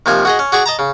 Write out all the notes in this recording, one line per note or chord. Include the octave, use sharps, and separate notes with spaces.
D#2 C3 F3 G#5
F#4 G#4 D#5
C#4
F#4 G#4 D5 C#6
D#5 A5 A#5
C#3